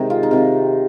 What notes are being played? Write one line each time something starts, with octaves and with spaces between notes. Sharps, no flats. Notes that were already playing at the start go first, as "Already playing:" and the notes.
Already playing: C3 D#3 G#3
F4
D#4
C3 D#3 F4